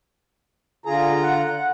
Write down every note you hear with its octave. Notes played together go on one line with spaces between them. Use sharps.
D3 F4 G#4 A#5
F#5